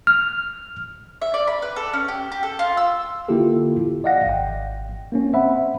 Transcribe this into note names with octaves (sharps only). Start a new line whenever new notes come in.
F6
E5
D5
B5
B4
A4
C#4
G4
G4
A4
F4
E6
D3 A#3 E4 F4 G4 A4
D5 D#5 F5 F#5 A#6
G#1 G5
A#3 C4 C#4
C5 E5 F#5 B5